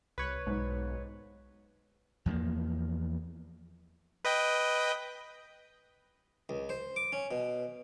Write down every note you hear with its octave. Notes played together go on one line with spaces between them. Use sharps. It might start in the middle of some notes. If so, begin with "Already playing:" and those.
C2 B4 C#5
B1 G#2
E2 F3 A3 A#3
B4 D#5 G5
C#2
C5
D6
C#4
B2